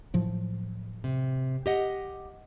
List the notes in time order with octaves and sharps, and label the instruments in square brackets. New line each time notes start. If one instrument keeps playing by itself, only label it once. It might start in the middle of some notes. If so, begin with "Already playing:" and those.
[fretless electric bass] A2 F3 F#3
[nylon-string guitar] C3
G4 D#5 F#5